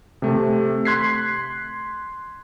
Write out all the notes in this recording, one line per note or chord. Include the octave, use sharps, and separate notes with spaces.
C3 A3
C6 F#6 G#6 B6 C7